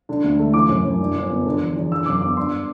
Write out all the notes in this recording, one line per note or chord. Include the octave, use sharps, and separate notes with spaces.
D3
D2
A3
E3 D6
F#2
F#2
G2
G1
B3
D3
E2
E2
D3 E6
F#2 D6
B3 D6
G2 C6